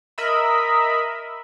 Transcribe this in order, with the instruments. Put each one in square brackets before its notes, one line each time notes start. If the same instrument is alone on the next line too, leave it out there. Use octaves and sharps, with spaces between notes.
[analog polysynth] A#4 D#5 E5 B5